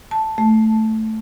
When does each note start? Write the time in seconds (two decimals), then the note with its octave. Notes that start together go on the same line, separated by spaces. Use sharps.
0.11 A5
0.38 A3